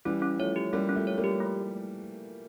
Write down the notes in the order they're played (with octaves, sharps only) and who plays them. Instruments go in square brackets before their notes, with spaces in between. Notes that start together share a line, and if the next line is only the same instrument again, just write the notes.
[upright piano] E3 G3 [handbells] C#4
[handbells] C#4
[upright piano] F3 A3 [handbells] C#5
[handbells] G4
[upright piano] G3 A#3 [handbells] C#4
[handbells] C#4
[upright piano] F3 A3
[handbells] C#5
[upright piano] G3 A#3
[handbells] G4
A3